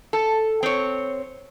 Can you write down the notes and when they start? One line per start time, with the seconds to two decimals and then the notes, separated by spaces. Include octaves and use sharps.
0.13 A4
0.63 C4 C#5